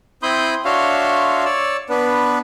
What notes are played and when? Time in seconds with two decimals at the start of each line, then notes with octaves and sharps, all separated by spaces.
0.23 C4 E4 B5 C6 D#6 G6
0.65 D4 F#4 C#5 E5 F5 C6
1.45 C#5 D5 E6
1.90 B3 D4 B4